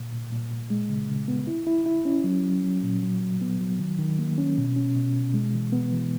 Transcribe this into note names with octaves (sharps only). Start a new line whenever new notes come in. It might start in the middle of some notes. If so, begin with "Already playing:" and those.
Already playing: A#2
A#2
A#2
A#2
G#3
C#3
C#3
B3
E4
E4
E4
C#4
F#3
F#3
F#3
A#2
F#3
F#3
B3
F#3
D#3
D#3
A#3
C#4
B2
C#4
B2
B2
G#3
E3
B3
E3